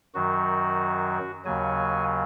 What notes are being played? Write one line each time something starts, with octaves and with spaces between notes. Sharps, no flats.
F#2 D#3 F#3 F#4
D#2 C#3 F#3 G#5